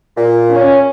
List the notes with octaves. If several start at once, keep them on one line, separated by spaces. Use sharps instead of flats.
A#2
C#4